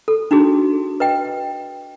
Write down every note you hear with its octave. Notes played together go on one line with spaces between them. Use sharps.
A4
D4 D#4 F#4 G#4
B4 D#5 G5